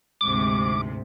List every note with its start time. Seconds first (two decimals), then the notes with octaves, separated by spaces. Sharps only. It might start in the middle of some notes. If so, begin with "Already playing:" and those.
0.21 D2 G#2 C3 D6